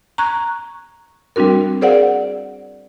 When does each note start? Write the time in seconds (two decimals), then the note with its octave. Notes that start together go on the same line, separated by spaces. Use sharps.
0.18 A#5 C#6 F#6 G#6
1.36 G3 C4 D4 F#4 A#4
1.81 G#4 A#4 C5 D5 F5 F#5